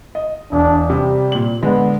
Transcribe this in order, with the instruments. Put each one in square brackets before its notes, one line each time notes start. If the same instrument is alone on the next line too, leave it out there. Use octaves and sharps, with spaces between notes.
[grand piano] D#5
[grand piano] E1 [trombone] D4
[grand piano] C3 [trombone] G3
[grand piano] A#2 F#7
[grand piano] D3 G#3 [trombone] B3